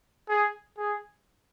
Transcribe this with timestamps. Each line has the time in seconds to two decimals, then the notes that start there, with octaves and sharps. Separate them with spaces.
0.29 G#4
0.78 G#4